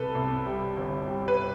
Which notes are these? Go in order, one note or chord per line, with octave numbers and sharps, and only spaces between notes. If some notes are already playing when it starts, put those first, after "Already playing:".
Already playing: C2 A4 B4
C2
G3
G1
G3
B4